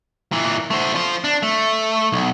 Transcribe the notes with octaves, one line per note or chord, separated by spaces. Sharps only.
A#2 E3
A3 C5
F4 C5
D4
A3
B1